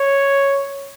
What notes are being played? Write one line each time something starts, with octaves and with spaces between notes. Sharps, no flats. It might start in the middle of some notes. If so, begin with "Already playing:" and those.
Already playing: C#5